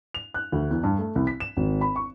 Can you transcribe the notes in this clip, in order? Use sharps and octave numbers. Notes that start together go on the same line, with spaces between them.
F7
F#6
D2
E2
G2
A3
C2
B6
E7
G#1
B5
C#6